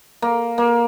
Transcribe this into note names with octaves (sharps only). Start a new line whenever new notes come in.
A#3
A#3